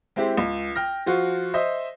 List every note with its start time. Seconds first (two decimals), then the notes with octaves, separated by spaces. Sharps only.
0.16 G#3 C4 E4 G4
0.37 C#2
0.75 G5 F6 A#6
1.06 F3 F4 F#4
1.54 C5 D#5 E5